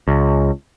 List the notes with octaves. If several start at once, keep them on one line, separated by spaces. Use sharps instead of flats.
C#2